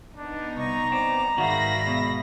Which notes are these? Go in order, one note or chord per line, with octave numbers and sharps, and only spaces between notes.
B3 D4 D#4
C2 D#5 A#5 C#6
C4 D5 D6
G#2 D#3 F#4 D5 E5 F5 B5 A#6
B2